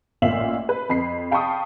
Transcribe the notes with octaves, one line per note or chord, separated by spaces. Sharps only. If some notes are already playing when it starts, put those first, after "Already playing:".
A1 A#2 E5 F5 F#7
B4
F2 B5 C7
F5 G5 A5 B5 C#6 D#6